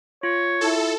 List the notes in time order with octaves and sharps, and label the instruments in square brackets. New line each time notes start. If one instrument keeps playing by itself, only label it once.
[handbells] F4 [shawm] C#5
[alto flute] E4 [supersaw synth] A4